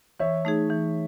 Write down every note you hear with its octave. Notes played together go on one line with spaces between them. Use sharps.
E3 C#5 E5
A3 D#4 G#4
E3